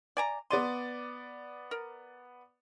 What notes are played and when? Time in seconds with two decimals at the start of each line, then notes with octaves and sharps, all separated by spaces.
0.17 D5 G#5 A#5
0.51 B3 D5 C6 D#7
1.71 A#4